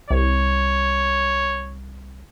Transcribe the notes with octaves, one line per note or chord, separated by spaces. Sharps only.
C2 C#5